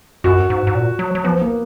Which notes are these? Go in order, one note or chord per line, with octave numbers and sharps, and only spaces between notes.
F#2 F#4
G#2
G#2
A#2
F#3
F#3
F3 B3
A#3